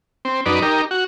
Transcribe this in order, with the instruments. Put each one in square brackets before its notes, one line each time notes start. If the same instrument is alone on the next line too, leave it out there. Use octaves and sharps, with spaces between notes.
[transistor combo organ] C4
F#2 D#4 B4 D5
D#4 G4 A#4
F#4